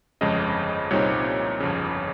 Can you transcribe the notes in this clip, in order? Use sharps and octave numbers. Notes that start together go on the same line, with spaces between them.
G1 F2 C#3 G#3 D#5
C2 A#2 G3 C4 D#4 C#5
G1 F2 C#3